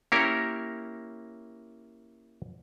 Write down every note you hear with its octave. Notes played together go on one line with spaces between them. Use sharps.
A#3 C#4 E4 G4 A#4 C#5